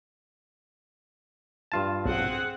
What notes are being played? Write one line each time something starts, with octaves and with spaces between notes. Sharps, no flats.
G2 F4 A5
B1 C4 G#4 F#5